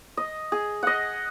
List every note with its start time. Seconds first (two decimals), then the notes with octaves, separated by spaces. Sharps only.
0.17 D#5
0.52 G#4
0.83 D#5 F#5